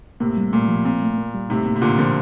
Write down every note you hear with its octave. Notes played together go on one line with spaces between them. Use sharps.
A2 C3 A#3
G3
A#2 A3
F3
A#2 C4
A3
A#3
G3
A2 C3 D#4
A#3
C3
A#2 D3 F4
D3 F3 A#3